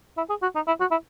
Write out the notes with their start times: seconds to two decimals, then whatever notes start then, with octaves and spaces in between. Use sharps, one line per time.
0.17 E4
0.30 G#4
0.42 F#4
0.55 D#4
0.67 E4
0.80 F#4
0.91 E4